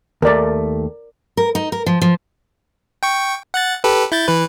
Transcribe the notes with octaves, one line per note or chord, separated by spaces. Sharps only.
D#2 A3 A#4 D5
A#4
D#4
A#4
F3
F3
G5 C#6
F#5 F#6 A6
G4 A4 B4
E4 G6 A6
E3 B4